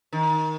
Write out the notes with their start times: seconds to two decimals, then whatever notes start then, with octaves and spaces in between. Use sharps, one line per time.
0.13 D#3